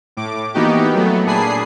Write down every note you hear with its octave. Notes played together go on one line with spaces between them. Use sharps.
A2 D6
E3 A#3 B3 D#4 F#4 G4
F#3 A3 B3
A#2 D4 G#4 G#5 B5 C7